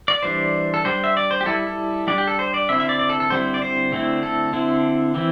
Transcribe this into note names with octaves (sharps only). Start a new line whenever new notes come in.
D5
E3 G3 D4 C5
A4
G3 D4 C5
E5
D5
C5
G4
G3 E4 A4
A4
G3 D4 D5
G4
A4
C5
D5
D3 C4 E4 E5
E5
D5
D5
A4
A4
D3 G3 C4 E4 C5
D5
C5
D3 A3 C4 E4
A4
D3 C4 E4
E3 C4 E4